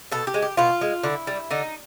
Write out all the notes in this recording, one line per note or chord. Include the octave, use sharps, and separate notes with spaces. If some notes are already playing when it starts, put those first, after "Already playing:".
B2 A4
G4
G#3
G4
B2 F4
G#3
D3 E4
G3
D3 D#4